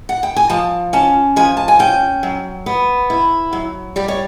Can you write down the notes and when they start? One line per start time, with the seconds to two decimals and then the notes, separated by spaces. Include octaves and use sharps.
0.09 F#5
0.23 G5
0.36 G#5
0.50 F3 A5
0.93 C#4 A5
1.36 F3 G#5
1.57 A5
1.68 G#5
1.79 C#4 G5
2.23 F#3
2.66 B3
3.10 E4
3.53 F#3
3.96 G3 D5
4.08 C#5